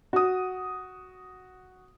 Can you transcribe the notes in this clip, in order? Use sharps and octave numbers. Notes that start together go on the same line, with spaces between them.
F#4 D#6